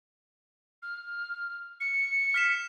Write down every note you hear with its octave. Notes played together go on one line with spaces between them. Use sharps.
F6
C#7
F6 B6 E7